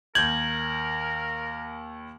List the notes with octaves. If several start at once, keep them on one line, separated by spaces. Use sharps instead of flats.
D#2 A#4 G6 G#6 F#7